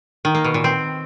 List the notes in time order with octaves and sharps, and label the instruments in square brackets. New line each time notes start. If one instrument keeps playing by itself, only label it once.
[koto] D#3
A#3
B2
A#2
C4